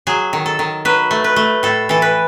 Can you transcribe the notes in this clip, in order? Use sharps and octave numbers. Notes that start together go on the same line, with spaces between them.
F#3 G#4
D#3
A4
D#3
F#3 B4
A3
B4
A3
A2 A4
E3 A4
B4